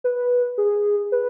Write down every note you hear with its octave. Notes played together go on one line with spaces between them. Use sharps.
B4
G#4
B4